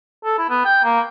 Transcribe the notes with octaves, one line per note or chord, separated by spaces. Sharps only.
A4
E4
B3
G5
A#3